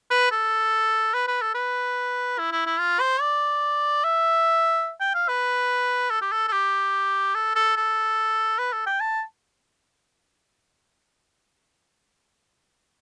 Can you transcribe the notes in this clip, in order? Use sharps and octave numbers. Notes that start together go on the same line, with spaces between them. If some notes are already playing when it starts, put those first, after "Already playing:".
B4
A4
B4
B4
A4
B4
E4
E4
E4
F4
C5
D5
E5
G5
F5
B4
A4
G4
A4
A4
G4
A4
A4
A4
B4
A4
G5
A5